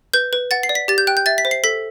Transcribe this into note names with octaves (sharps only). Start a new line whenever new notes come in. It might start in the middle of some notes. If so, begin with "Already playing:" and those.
B4 G6
B4
F#5 A6
C7
D5
B6
G4 A6
G6
G5 F#6
G6
E5 A6
B6
C5
C7
A4 B6